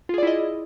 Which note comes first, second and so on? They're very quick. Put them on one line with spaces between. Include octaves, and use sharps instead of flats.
F4 G#4 D5 E4 D#5